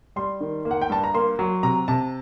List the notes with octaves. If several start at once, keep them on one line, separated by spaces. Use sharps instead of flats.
G3 C6
D#3
A#3
F#5
G5
G2 A5
A#5
A#3 C6
F#3
C3 A#5
C3 A5